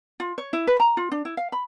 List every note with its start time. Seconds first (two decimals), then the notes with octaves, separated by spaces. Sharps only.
0.20 F4
0.38 C#5
0.53 E4
0.67 B4
0.80 A#5
0.97 F4
1.12 D4
1.25 E4
1.37 F5
1.52 B5